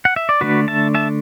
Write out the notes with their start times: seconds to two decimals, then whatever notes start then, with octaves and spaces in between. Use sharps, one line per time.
0.05 F#5
0.16 E5
0.29 D5
0.41 D3 A3 D4 F#4 B4
0.68 E5 A5
0.95 E5 A5